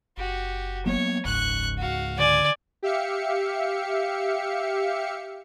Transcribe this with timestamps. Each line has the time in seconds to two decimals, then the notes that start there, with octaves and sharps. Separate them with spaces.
0.17 F#1 F#4 G4
0.86 F#3 A#3 B3 C#5
1.25 F#1 C#2 G#2 C#6 F#6
1.78 F#4 F5
2.19 D3 D5 G#5
2.83 G4 E5 F5 C#7